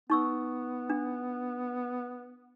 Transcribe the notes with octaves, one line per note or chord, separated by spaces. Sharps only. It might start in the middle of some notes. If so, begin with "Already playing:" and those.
B3 D#4 C#6 E6
D4